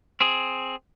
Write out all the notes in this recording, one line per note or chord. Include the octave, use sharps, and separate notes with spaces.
C4 G#4